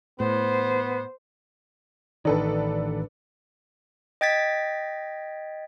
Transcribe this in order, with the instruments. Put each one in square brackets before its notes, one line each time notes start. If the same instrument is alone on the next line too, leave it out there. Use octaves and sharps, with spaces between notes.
[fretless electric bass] A2 [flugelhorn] B3 [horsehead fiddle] C5
[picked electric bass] A1 D#3 [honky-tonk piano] D4 A4 B4
[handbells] D#5 G5 G#6 A6 B6